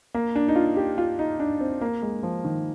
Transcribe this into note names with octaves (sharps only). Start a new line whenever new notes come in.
A#3
D4
D#4
F4
G4
F4
D#4
D4
C4
A#3
G#3
F3
D#3